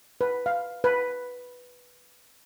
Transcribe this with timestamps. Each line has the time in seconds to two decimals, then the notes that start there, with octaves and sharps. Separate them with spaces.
0.21 B4
0.46 F5
0.84 B4